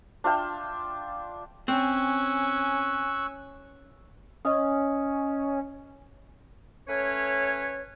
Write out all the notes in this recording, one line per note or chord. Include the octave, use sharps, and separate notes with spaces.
D4 F4 E5 G5
C4 C#4 G#5 C#6 E6 F#6
C#4 D#5 D#6
A3 C#4 B4 C#5